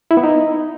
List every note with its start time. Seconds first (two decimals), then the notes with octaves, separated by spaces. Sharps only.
0.11 E4
0.17 B3
0.24 D#4